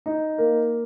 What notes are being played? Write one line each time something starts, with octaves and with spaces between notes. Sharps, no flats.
D#4
A#3